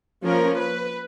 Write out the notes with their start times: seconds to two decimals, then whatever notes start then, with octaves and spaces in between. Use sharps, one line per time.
0.24 F3 A#3 C#4 A#4
0.58 B4